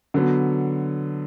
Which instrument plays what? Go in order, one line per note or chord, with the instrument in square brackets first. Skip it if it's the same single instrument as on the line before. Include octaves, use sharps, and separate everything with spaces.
[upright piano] D3 F#3 B3